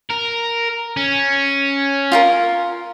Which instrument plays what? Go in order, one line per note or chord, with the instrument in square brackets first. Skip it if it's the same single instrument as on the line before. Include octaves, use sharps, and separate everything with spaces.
[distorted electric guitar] A#4
C#4
[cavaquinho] F4 G4 A#4